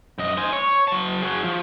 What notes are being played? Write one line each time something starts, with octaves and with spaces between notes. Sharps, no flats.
F#2 D#5
C5 G#5
C#5
F#3 A5
F#4 G#4
F3